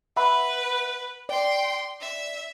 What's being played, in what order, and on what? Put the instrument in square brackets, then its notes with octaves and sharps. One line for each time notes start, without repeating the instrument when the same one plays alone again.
[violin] B4 [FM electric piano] E5 F#5 B5
[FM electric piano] D5 [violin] G5 C6
[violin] E5